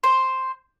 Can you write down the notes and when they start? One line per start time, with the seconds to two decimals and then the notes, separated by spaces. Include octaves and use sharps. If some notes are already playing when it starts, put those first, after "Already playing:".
0.04 C5